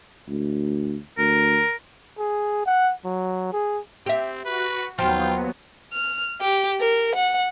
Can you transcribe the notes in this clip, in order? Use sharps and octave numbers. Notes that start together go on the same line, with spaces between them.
D2
D2 A#4
G#4
F#5
F#3
G#4
C4 G4 E5
F#4 B4
D#2 F3 F#3 B3 F4 G5
F6
G4
A#4
F#5